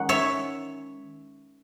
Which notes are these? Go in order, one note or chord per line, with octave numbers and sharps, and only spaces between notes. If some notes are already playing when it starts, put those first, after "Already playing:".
Already playing: D#3 G#3 C#4 F#5
C#5 E5